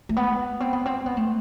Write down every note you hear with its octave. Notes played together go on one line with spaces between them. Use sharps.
A3
B3
C4
B3
C4
B3
A3